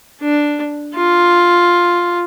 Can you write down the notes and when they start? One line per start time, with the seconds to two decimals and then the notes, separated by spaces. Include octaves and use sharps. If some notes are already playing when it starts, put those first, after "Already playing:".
0.21 D4
0.96 F4